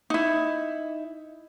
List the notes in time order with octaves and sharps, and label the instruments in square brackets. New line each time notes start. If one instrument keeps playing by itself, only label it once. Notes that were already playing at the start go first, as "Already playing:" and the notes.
[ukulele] D#4 E4